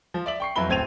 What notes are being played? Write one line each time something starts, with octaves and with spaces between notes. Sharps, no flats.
F3
D5 E5 F#7
G5 C#6 C7
F2 F#3 E4 B4 B5 G7
D1 A2 C4 G#6 D#7 F7